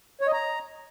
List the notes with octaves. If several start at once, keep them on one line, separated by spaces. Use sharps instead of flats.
C#5
D#5
A#5